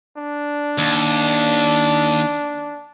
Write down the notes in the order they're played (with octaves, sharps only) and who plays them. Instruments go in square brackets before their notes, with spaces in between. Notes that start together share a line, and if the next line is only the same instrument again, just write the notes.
[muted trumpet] D4
[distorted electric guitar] D#2